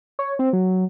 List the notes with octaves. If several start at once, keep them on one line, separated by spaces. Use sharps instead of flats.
C#5
C4
F#3